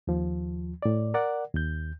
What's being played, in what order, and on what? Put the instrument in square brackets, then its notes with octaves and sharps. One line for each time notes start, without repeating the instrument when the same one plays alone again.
[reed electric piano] D#2 F3
A2 D5
A#4 D5 F#5
D#2 G6